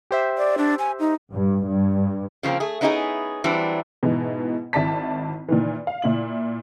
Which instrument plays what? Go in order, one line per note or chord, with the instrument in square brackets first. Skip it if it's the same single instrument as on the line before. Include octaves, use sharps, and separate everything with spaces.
[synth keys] G4 C5 E5
[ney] D5
D4
G#5
D#4
[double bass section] G2
G2
[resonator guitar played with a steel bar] C#3 F3 F#3 A#3 C4
A3 G#4
B3 C#4 D#4 E4 G4 G#4
E3 F#3 G3 C4 D4
[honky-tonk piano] G#2 B2 E3
G#1 E4 D5 A5 B6
A#2 D#3 E3
F5
A#2 E4 F#7